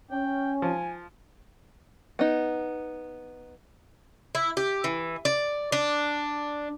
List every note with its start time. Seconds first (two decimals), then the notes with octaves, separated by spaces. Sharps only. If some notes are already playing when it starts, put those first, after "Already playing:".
0.11 C#4 G5
0.62 F3 G#5
2.19 B3 D#4
4.35 E4
4.57 G4
4.84 E3
5.25 D5
5.72 D4